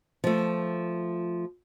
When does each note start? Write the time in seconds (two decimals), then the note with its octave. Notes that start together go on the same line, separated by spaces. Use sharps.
0.24 F3 A3